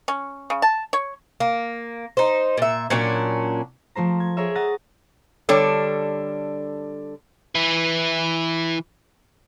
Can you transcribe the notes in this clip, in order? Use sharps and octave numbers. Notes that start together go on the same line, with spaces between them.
C#4
C#3
A5
C#5
A#3
D#4 C5
A#2 E5
A#2 F#3 C#4 D4
F3 A3 C5 A#5
G#6
G#4 A#4 C#5 E5
F#5 A#5 D#6 A6
D3 G3 D4 A4 C#5
E3 E4